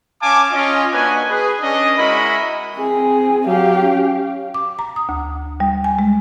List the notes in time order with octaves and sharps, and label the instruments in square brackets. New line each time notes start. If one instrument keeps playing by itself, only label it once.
[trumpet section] C#4 F5 G#5 A5 D6
C#4 F4 D#5
A#3 D4 F#4 B4 D#5 G#5
G#4 B4
C#4 D4 D#5
G#3 E4 F#4 A#4 D#5 B5
[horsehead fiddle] C4 G#4
[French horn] F#3 [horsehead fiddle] G4 F5
[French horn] C#4
[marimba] D6
A#5
D#6
D2
G3
G#5
G#3